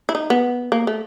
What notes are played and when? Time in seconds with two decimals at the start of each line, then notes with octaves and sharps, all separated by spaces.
0.09 E4
0.15 D#4
0.30 B3
0.72 A#3
0.87 A3